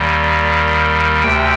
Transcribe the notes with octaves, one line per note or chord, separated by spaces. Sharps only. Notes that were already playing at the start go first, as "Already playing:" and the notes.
Already playing: D#2 D#3 G3
D2 C3 G5